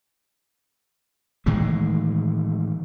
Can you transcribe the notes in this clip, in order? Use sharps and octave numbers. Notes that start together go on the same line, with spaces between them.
A2 D#3 E3 G#3